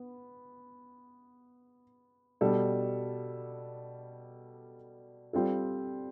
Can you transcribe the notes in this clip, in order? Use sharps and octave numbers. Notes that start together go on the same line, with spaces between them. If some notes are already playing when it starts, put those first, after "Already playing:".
Already playing: B3
B2 G3 D4 A4
G3 C4 F4 A4